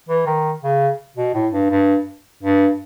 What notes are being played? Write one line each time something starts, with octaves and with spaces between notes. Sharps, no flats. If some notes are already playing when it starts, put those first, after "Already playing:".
E3
D#3
C#3
B2
A2
G2
G2
G2